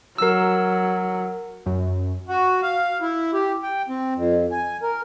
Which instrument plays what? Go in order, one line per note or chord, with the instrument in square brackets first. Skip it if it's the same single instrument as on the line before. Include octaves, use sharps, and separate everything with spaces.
[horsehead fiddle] F#3 [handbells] A#4 E6
[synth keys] F#2
[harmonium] F#4
F5
E4
G4
G5
C4
F2
G#5
A#4